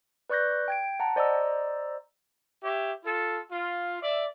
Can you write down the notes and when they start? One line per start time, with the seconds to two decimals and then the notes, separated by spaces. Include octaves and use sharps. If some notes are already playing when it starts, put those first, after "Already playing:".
0.30 B4 D5 C#6 F#6 G6 A#6
0.68 G5 G#6 D7
1.00 F#5 A5 A#5
1.16 C5 D5 D#5 A#5 E6
2.63 G4 C#5 E5
3.04 F4 A4
3.51 F4
4.01 D5 E5